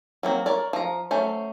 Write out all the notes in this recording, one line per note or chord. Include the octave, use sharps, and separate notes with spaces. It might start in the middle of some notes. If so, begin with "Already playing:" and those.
F#3 A#3 C4
A#4 C#5 D5
F3 A#5
F#3 A3 C#4 C5